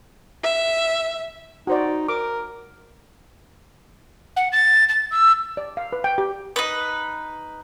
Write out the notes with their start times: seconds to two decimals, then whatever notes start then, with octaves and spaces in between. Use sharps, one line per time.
0.44 E5
1.67 D#4 F#4 C5 D5
2.09 A#4 D6
4.37 F#5
4.52 A6
4.89 A6
5.11 E6
5.57 D5
5.77 F5
5.93 B4
6.04 G5
6.18 G4
6.56 D#4 B4